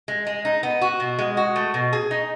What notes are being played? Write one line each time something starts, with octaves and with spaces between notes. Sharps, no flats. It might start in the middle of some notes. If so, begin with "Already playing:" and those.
G#3
G#3
D#4
B3
F#4
B2
G#3
F#4
A3
B2
G#4
D#4